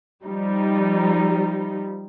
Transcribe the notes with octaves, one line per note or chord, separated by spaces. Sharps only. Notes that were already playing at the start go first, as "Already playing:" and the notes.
F3 G3 D#4